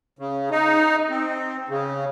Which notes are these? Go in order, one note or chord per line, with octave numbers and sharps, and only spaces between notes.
C#3
D#4
C4
C#3